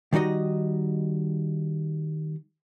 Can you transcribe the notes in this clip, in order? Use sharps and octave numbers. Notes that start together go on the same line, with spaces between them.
D#3 G3 D#4 F#4 D#5